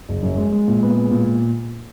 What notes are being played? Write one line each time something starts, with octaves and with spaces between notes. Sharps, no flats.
F#1
F#2
G#3
G#3
A#2
B3
G#3
A#2